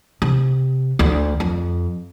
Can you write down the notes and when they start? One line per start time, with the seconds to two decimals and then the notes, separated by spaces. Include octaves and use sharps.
0.22 C3
0.99 D2
1.40 F2